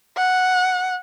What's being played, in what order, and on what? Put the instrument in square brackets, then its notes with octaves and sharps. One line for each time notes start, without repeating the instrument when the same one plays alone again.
[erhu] F#5